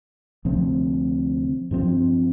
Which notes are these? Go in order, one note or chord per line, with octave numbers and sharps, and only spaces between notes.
D2 C3 F3 C4
G2 F3 C4